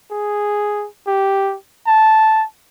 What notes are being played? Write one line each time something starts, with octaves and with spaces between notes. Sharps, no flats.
G#4
G4
A5